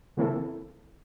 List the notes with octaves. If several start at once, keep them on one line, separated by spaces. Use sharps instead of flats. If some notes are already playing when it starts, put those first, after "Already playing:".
C#3 E3 A#3 C4 E4 A4